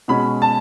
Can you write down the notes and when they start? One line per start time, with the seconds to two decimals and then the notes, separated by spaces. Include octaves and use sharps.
0.08 B2 G#3 C#4 B5
0.42 A5